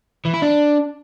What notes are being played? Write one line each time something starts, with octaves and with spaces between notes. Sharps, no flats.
E3
E4
D4